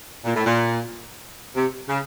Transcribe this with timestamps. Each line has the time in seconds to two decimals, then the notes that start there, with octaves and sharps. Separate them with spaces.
0.25 A#2
0.35 A2
0.45 A#2
1.56 C3
1.88 C#3